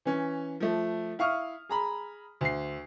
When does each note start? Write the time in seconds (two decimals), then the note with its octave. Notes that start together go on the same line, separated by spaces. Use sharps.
0.05 E3 C#4
0.60 F3 A3
1.19 E4 F5 C#6 D#6 F6
1.69 G#4 A#5 B5
2.41 D2 C7